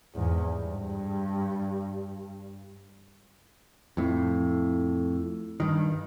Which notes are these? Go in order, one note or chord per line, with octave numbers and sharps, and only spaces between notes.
E2 G#2
G2
F2 A2
G2 D#3